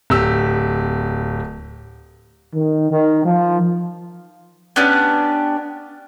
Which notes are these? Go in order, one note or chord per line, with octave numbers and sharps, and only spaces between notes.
D1 G4 E6
D#3
D#3
F3
B3 C#4 D4 G4